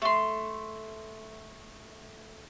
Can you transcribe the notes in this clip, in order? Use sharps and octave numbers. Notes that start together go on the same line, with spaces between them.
A3 C6